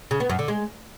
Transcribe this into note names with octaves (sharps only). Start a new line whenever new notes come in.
C#3
B3
F#2
D3
G#3